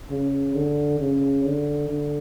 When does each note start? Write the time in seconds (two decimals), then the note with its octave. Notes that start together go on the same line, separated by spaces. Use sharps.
0.10 C#3
0.55 D3
1.00 C#3
1.44 D3
1.88 D3